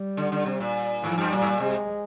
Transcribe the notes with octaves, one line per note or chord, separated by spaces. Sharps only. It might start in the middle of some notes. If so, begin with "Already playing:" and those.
Already playing: G3
D3
D3
C3
A#2
G#2 F3
G2
A#2 G3
G#2
A#2
C3 G#3